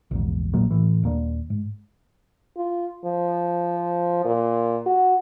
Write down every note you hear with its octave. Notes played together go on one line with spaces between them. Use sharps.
A#1 E2 G#2
A#1 A#2 F#3 A#3
A2 E3
D#1 A#3 D4
G#2
F4
F3
A#2
F#4